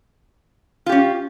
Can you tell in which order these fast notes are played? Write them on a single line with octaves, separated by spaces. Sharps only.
F4 G4 C#4